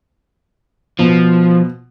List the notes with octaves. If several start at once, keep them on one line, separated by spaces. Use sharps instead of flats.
B2 F3